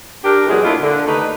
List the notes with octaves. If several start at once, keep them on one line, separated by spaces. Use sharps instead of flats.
D4 G4 A#4
E2 A#2 E3 F#3 G#3
A#2 G#3 A3 D4 E4 F4
D3
D#2 A3 D#4 B4